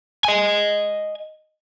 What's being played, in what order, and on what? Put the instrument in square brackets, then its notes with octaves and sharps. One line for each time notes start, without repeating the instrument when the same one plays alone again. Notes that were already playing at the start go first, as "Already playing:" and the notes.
[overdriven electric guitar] D#5 G#5